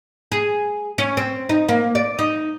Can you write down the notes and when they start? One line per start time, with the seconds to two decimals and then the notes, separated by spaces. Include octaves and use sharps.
0.32 G#4
0.98 C#4
1.17 C4
1.49 D#4
1.69 A#3
1.95 D5
2.19 D#4